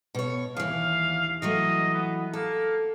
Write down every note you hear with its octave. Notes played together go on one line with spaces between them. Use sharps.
B2 C#5
D#2 E3 F5
E3 F#3 A3 D#5
B3
A#3 A4